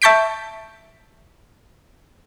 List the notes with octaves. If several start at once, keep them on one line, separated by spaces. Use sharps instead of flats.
E5 A5 C#6 G6 B6 D7